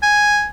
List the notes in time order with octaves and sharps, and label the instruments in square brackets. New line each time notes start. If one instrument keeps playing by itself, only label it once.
[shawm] G#5